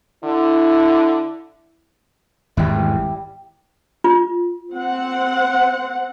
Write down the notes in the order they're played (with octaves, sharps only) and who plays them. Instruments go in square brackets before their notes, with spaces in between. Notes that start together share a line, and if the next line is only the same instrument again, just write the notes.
[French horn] D3 [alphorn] E4
[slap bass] G#1 E2 [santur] G3 E4
[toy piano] F4
[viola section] C4 F#5